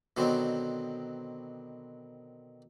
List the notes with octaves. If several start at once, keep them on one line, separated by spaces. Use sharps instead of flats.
B2 D3 D#3 F#3 C4